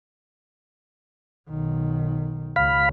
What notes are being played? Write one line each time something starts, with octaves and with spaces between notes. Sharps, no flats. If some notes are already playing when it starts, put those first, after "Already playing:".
B1 D#3
C#2 F5 B5